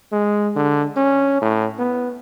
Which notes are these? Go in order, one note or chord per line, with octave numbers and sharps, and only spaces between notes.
G#3
D3
C#4
A2
B3